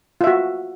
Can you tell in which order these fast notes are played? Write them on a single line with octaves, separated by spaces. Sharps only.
F4 E5 F#4